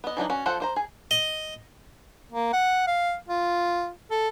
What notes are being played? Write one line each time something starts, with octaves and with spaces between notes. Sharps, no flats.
B3 D#5
E3 F#3 D4 D#4
C#4 F#4
F3 A4 C5 F#5
D4 C5 A#5
G#4
D#5
A#3
F#5
F5
F4
A4